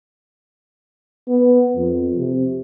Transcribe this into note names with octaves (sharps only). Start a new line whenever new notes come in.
B3
F2
C3